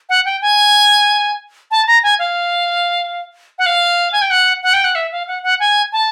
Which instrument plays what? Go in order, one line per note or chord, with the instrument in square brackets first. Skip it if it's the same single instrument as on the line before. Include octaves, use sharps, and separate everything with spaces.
[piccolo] F#5
G5
G#5
A5
A#5
G#5
F5
F#5
F5
G#5
G5
F#5
F#5
G5
F#5
E5
F5
F#5
F#5
G#5
A5